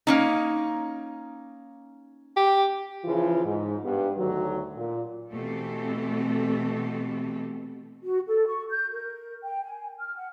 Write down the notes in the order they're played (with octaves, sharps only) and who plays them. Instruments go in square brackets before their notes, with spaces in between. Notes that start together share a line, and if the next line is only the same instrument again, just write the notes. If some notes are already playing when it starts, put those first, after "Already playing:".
[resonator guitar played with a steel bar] A#3 C#4 D#4
[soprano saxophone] G4
[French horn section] C#3 E3 F3 F4
G#2
G2 B3
D2 D#3 F#3
A#2
[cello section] B2 E3 A3 C4 G4 A4
[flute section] F#4
A4
C#6
G6
A#4
G5
G#5
F6
F#5